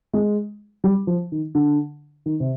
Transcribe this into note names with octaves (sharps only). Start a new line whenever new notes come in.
G#3
G3
F3
D#3
D3
D#3
C3